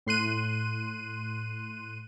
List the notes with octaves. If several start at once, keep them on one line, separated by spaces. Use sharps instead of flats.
A2 C6 F#6 D#7